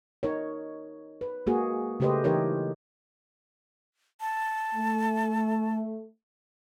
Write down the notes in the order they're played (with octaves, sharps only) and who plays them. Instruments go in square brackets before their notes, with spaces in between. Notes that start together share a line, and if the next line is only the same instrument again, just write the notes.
[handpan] D#4 A#4 C#5
B4
G#3 A#3 F#4 G#4
C#3 A3 G4 B4 C5 D#5
E3 D#4 G4 A#4 C#5
[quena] A5
[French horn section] A3